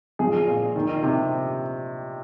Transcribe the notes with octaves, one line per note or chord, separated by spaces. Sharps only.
F3 G#4
A#2
D#3
C3